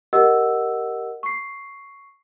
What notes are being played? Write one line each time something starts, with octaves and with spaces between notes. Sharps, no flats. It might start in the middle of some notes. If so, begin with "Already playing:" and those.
G4 A#4 D#5 F#5 E6
C#6 C7